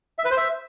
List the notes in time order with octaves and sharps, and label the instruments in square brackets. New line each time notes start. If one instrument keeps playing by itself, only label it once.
[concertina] E5
B4
C5
E5